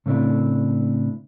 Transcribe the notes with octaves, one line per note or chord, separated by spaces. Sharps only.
A2 C#3 A3 C4 D4 E4